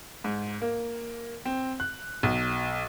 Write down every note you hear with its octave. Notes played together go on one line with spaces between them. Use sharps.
G#2
A#3
C4
F#6
B1